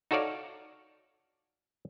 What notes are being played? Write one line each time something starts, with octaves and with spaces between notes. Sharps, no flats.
D#4 F#4 A4 C#5 D5 F5